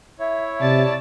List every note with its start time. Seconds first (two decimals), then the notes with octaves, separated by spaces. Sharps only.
0.19 E4 C#5 E5
0.61 C3 D5 A5